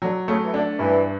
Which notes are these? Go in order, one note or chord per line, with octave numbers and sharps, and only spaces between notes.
D3 F#3
C#3 A3
E3
D3 D4
G2 E3